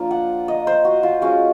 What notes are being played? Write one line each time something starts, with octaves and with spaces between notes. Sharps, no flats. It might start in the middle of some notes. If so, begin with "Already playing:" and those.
Already playing: F3 A#3 D4 F4
F#5
D#5
C5
F#4
F4
G#3 C#4 F4 F#4